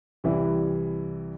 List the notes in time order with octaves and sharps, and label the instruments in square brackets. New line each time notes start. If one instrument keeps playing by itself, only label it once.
[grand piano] C2 C3 E3 G3 E4